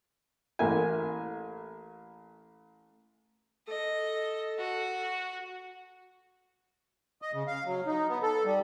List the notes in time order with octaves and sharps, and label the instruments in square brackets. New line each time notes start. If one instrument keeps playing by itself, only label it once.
[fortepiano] A1 A#3 E5 G#5
[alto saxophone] A4 [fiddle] D#5
[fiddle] F#4
[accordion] D#5
C#3
F5
F#3
D#4
B3
A4
G3